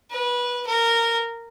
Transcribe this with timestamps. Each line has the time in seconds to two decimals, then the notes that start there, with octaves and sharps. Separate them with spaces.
0.11 B4
0.66 A#4